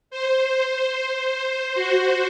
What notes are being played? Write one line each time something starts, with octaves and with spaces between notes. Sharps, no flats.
C5
C5
C5
F#4